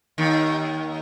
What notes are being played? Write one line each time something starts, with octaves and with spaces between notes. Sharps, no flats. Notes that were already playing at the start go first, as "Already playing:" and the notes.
D#2 D#3